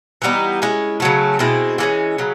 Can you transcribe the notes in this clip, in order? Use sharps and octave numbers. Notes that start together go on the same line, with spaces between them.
E3 G3 B3 D#4
G#3 C#4 E4
C#3 F#3 A3
B2 G#3 C4 E4
E3 G#3 C#4
C#3 F#3